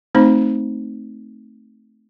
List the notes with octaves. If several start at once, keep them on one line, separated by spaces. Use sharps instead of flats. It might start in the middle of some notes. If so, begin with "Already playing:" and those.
A3 C4 D#4 C5 B5